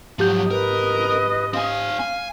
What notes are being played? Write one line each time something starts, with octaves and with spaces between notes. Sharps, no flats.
G#2 F3 F#3 G4 G6
A#4 B4 D#5
C4 F5 G#5
G#5